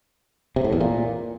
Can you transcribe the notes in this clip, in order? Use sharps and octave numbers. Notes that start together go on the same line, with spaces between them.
C3
A2
E2
A#2